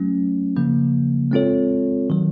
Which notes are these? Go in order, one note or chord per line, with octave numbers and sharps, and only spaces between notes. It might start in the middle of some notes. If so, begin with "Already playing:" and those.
Already playing: F#3 A3 C#4
C#3 F3 A#3
G#3 C4 F4 A4 C#5
D#3 F#3